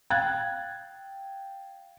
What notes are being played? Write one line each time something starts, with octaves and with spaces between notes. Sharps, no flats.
F5 G5 F#6 G#6 A6